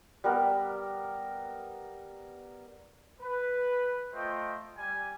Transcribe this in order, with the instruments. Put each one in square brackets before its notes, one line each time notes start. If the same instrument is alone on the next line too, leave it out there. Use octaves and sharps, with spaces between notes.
[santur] G3 B3 A#4
[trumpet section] B4
A3 F4 C5 D#5 G5
G3 G#5